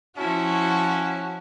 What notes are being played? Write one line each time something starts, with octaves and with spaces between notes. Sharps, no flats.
F3 C#4 E4 F#4 A5